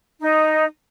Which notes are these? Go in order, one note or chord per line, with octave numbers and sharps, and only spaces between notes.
D#4